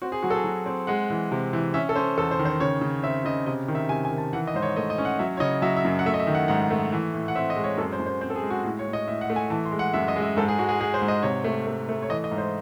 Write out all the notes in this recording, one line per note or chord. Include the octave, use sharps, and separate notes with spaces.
C4 F#4
G#4
F#3 F#4
A4
G#4
F#3
C4
G#3 F#5
E3
C3
E3
C#4 E5
A4
C#4 C5
E2 A4
C5
D#3
C5
C#3 C#5
C#3
C4 E5
C#3 D#5
C3 D#5
D#3
E5
C3 G#5
G#5
D#3
A5
E3 F#5
D#5
G#2 C5
C#5
A3 D#5
D#5
C#4
F#5
F#3 E5
C#5
C#3 D#5
F#3 E5
E5
F#2
F#5
A3 E5
D#5
E5
D#3
F#5
G#2 F#5
A3
E3
A2
F#5
C4 E5
D#5
G#3
C#5
F#2 A4
C5
F#2
C5
C4 C5
A4
G#4
G#3
F#4
A2 F#4
C#5
A2
D#5
A2 E5
F#5
A3
G#5
E3 A5
C6
G#3
F#5
F#2 E5
D#5
G#3
E5
G#2 A4
G#4
G#3 F#4
G#4
G#3 G#4
C5
G#2
D#5
C3 C#5
A3
A3
A3
C#5
E3 D#5
D#5
G#2
C5